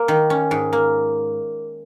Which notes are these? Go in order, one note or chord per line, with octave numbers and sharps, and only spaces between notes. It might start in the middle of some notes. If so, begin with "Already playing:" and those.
Already playing: A#3
D#3
C#4
G#2
A#3